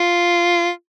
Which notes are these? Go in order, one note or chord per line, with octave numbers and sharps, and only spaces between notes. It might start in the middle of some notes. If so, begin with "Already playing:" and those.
Already playing: F4